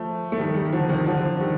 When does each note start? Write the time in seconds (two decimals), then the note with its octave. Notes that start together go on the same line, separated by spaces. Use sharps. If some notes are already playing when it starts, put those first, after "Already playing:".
Already playing: F3 A3
0.32 A3
0.39 D#3 G3
0.55 D#3 G3
0.73 D3 F3
0.89 C3 D#3
1.06 D3 F3
1.40 D#3 G3